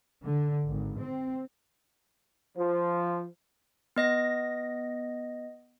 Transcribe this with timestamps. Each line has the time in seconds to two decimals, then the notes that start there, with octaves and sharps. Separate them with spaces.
0.23 D3
0.68 G#1
1.01 C4
2.57 F3
3.96 B3 D#5 A#6